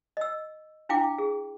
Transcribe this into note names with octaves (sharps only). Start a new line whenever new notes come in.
D#5 E6
D4 E4 F5 G5 D6
G#4